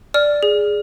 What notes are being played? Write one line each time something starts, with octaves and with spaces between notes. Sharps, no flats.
D5 F6
G#4